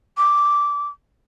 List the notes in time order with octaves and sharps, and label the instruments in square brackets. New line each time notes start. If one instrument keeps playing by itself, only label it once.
[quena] D6